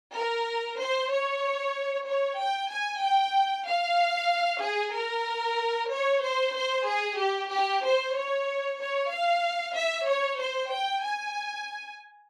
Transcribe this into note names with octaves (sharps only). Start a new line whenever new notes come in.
A#4
C5
C#5
C#5
G5
G#5
G5
F5
G#4
A#4
C#5
C5
C5
G#4
G4
G4
C5
C#5
C#5
F5
E5
C#5
C5
G5
G#5